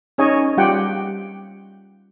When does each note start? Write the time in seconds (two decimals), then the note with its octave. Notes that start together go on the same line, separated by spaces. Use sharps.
0.18 C#4 D#4 G#4 C#5 D#5 G#5
0.57 G3 F4 G4 F#5 G5